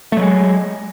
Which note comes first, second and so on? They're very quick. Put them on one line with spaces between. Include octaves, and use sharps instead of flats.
A3 F#3 G#3